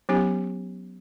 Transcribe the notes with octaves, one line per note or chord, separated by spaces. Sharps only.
F#3 B3 C#4 D#4 G4